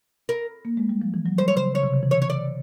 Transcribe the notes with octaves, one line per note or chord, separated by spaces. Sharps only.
A#4
A#3
G#3
G3
F3
E3
F#3
G3 C5
C#5
C#3 C5
C#3 C#5
C3
C#3
E3
C#5
C#5
D5